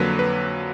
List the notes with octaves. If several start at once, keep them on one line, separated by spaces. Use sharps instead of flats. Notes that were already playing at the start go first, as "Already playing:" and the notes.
Already playing: F2 D3 F#3 A#3 B4
B4